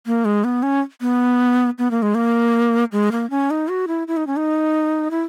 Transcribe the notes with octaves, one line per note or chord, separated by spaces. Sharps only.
A#3
G#3
B3
C#4
B3
B3
A#3
G#3
A#3
G#3
A#3
C#4
D#4
F#4
E4
E4
D#4
C#4
D#4
E4